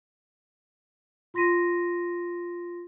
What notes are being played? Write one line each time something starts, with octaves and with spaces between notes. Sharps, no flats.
F4 C6 A#6 B6 D#7